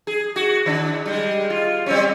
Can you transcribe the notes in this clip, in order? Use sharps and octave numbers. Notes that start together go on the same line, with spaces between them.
G#4
F#4
D#3 D4
G3 G#3
F4
G3 C4 C#4